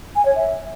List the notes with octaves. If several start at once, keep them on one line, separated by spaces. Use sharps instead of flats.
G#5
C#5
E5